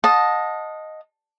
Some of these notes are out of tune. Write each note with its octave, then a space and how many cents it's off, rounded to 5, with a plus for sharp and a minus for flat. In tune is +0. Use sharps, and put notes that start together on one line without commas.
D#5 +0 F#5 -45 A5 +0